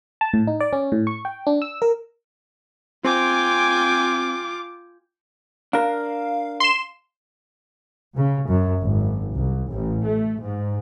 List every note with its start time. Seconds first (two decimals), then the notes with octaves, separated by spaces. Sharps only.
0.21 A5
0.33 A2
0.47 D#4
0.60 D5
0.73 C#4
0.92 A2
1.07 C#6
1.25 G5
1.47 D4
1.62 E6
1.82 A#4
3.05 C4 F4 G5 G#5 D6
5.73 D4 A#4 F5
6.60 C6 E7
8.17 C#3
8.48 F#2
8.82 G#1
9.35 C2
9.69 A1
10.06 A3
10.41 G#2